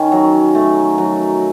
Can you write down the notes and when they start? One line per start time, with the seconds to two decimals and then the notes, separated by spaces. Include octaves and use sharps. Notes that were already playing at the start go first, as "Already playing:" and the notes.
Already playing: D#3 C#4
0.12 F#3
0.55 A3
0.98 F#3